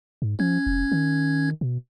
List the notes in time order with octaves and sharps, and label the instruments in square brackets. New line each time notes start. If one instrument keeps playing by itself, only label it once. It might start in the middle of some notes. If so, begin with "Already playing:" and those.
[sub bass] G#2
[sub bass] F3 [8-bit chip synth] C#4 G#6
[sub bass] F1
D#3
B2